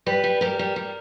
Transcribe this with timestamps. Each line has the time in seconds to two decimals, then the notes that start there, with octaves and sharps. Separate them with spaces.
0.06 G3 B4
0.24 G3
0.41 G3 A#4
0.59 G3
0.76 G3